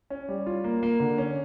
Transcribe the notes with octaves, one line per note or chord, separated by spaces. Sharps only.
C#4
G3
F4
A#3
A#3
D3
C#4